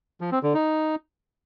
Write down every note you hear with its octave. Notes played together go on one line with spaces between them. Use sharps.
F3
C4
D3
D#4